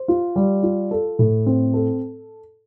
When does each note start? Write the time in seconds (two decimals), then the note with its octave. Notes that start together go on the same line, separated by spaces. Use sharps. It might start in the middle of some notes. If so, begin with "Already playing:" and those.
Already playing: C5
0.08 F4
0.36 G3
0.63 F4
0.91 A4
1.19 A2
1.46 C4
1.74 A4